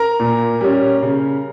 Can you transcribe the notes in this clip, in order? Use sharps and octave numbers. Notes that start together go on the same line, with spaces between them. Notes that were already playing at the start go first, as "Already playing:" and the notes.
Already playing: A#4 A#5
A#2
G3 C#4
C#3